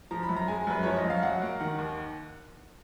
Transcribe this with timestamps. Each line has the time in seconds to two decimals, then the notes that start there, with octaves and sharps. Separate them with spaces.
0.11 F3 A#5
0.23 B5
0.29 F#2
0.37 A#5
0.48 G#3 G#5
0.67 F#2 B4
0.83 F3 C#5
0.97 D#5
1.04 F#2
1.10 F5
1.23 F#3 F#5
1.42 A#3
1.60 D#3 F#5
1.79 D#2